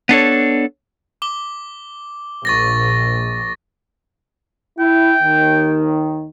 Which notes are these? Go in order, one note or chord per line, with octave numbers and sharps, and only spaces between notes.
B3 D4 A4 C#5
D6 G7
A#1 C#6 A6 A#6
E4 G5
D#2 D#3